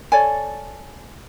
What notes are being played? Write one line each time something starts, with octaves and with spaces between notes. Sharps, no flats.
A4 C#5 D5 G#5